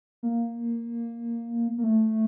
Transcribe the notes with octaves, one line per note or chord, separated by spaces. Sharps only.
A#3
A#3
A3